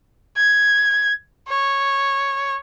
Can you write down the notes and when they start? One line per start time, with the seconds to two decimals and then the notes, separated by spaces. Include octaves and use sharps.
0.37 G#6
1.48 C#5